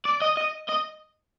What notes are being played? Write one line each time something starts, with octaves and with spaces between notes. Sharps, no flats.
D5
D#5
D#5
D#5